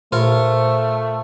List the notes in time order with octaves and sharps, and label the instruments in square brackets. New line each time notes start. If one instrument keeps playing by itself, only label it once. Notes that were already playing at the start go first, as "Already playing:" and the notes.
[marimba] A#2 [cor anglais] A3 [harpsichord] F4 A#4 C#5 [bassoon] C5